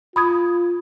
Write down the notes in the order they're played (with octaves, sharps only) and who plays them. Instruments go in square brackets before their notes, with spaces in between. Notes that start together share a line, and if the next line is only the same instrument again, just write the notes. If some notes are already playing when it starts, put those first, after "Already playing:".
[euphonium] F4 [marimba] B5 D#6 G#6